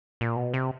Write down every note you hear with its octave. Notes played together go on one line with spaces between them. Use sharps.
A#2
B2
C3